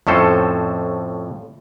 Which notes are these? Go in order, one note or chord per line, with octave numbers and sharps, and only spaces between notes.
F2 A2 C#4 A4 C5